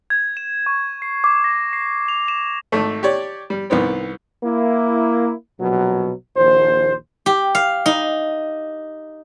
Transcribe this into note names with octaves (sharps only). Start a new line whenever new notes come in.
G#6
E7
C#6
C7
D6
A#6
C7
F7
E7
G#1 A3
G4 C#5 D5
G3
C2 D#3 B3 C4
A#3 E4
A#1 B2 F#3
A#1 D#2 C5
G4
F5
D#4